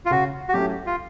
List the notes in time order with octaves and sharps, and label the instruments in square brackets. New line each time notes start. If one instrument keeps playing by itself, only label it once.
[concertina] F4
[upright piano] C#3 [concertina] F#4
[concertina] F#4
[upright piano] F#3 A3 C#4 E4 [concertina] G4
[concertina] F4